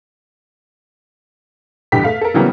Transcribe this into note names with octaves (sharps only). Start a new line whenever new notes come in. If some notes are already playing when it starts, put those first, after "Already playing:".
E2 G2 B2 D3 G4 B6
A3 F5
A4 A#4
C#3 E3 F#3 G3 A#3 B3